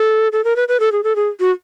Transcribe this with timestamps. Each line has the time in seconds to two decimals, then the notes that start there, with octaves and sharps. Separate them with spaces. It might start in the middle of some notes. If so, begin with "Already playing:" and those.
Already playing: A4
0.32 A4
0.44 A#4
0.56 B4
0.68 B4
0.80 A4
0.92 G#4
1.04 A4
1.16 G#4
1.40 F#4